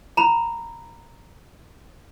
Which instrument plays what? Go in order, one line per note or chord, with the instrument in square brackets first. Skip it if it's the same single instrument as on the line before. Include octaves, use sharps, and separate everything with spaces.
[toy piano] A#5 B5